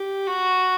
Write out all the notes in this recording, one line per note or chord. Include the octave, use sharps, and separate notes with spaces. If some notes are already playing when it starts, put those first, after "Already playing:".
Already playing: G4
F#4